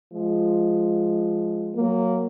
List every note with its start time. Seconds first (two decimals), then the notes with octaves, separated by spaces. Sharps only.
0.12 F3 G#3
1.76 F#3 A#3